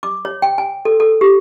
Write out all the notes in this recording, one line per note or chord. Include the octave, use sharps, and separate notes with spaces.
D6
C#5
G5
G#5
A4
A4
G4